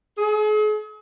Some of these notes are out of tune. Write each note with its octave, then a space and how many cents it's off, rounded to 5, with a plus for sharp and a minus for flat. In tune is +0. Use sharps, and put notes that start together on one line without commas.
G#4 +40